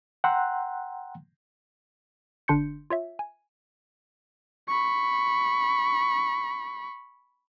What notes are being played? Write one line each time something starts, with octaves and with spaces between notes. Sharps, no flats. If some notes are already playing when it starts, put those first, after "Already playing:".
F#5 G5 A#5 C6 E6 F#6
G1 D3 D4 C6 G6 C#7
F4 C#5 E5
G#5
B5 C#6